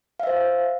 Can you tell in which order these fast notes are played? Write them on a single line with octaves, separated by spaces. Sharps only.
F5 E5 C5